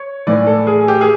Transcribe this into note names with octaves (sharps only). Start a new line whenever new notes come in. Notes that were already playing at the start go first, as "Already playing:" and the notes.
Already playing: C#5
A2 E3 D5
A4
G#4
G4
G#4